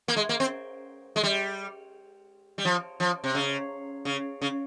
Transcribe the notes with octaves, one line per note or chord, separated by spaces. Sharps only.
A#3
G#3
A#3
C4
G#3
G3
G3
F3
F3
C3
C#3
C#3
C#3